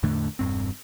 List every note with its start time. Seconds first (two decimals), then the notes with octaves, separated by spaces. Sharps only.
0.03 E2 A2 D3 A3
0.39 E1 G2 C4